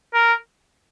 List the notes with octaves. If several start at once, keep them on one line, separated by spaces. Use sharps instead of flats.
A#4